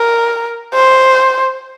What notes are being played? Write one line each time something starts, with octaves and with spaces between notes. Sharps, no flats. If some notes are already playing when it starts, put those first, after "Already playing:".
Already playing: A#4
C5